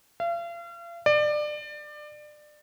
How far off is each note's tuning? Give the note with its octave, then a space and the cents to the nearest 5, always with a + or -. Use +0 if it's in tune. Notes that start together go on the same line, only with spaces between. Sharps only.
F5 -40
D5 +25